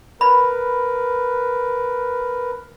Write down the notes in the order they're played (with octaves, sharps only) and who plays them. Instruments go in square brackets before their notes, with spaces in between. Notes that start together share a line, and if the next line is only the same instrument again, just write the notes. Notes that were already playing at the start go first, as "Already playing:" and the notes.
[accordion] A#4 B4 [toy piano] B5